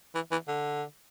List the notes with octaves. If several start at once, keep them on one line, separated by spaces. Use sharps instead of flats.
E3
E3
D3